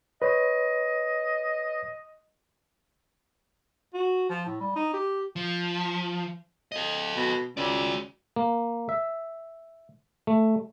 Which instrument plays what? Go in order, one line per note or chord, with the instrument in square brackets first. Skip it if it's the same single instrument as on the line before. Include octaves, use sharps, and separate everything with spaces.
[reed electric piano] B4 C#5 [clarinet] D#5
[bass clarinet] F#4
F3
A2
G3
D#4
G4
[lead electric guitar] F3
A4 D#5
[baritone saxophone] B2
[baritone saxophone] C#2 [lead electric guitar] F#4 D5
[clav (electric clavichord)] A#3
E5
A3